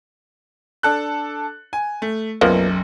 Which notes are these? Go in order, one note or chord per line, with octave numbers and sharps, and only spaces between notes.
D4 A4 F#6
G#5
A3
F#1 B1 F3 A#3 B3